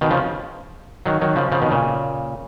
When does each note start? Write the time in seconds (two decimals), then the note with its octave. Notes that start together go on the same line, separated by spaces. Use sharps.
0.01 B2 D#3
0.10 C#3 F3
1.06 D#3 F#3
1.21 D#3 F#3
1.36 C#3 F3
1.52 C#3 F3
1.61 B2 D#3
1.71 A#2 C#3